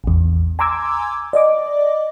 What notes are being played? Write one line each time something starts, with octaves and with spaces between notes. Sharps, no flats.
A1 E2
G#5 A#5 C6 D6 E6 G#6
D5 D#5 D6